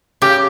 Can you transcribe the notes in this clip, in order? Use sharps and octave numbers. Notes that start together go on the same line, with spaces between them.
C#3 G4